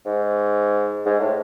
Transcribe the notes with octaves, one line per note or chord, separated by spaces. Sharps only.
G#2
G#2
A2